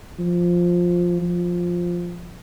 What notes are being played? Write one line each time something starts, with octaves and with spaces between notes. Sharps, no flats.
F3
F3